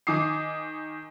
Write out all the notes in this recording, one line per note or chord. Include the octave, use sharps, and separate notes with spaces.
D#3 G#5 D6 D#6 C7